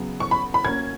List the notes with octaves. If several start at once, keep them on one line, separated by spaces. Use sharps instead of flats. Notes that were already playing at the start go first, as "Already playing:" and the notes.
Already playing: C#3 F#3 B3
C#6
B5
B5
A#3 C#4 F#4 A#4 G#6